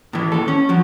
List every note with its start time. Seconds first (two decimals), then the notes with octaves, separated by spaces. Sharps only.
0.13 A2 E3
0.32 D#2 A4
0.48 C#4
0.69 F3 F#3